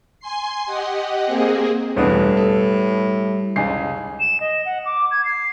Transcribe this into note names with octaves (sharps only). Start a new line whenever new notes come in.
G#5 C6 C7
G4 D#5 F#5
A#3 C4 G#4
E1 E2 A2 G3 B3 D4 D#6
A4
F#1 C#2 C#4 G#5 C7
E7
D#5
F#5
D6
G#6
C7